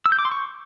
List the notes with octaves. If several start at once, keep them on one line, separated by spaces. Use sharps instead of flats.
E6
G6
D6
C6
C#6